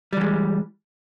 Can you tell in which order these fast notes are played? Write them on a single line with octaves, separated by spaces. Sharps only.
G3 E3 G#3